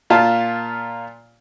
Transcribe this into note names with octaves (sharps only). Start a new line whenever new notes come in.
A#2 F4 A5